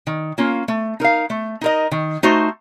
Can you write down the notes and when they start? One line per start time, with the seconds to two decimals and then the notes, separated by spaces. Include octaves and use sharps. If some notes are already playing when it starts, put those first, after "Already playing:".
0.07 D#3
0.38 A#3 C#4 F4
0.68 A3
1.00 D#4 A#4 F5
1.30 A3
1.61 D#4 A#4 D#5
1.91 D#3
2.23 A3 D#4 F#4 C5